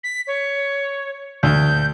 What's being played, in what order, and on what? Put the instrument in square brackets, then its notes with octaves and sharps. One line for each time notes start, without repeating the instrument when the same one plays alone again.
[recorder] B6
C#5
[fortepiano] D2 [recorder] G6